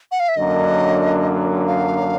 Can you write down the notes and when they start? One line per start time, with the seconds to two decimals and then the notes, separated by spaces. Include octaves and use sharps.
0.12 F#5
0.20 F5
0.29 E5
0.37 F#2 D3 F#3 A#3 D4 D#5
1.67 F5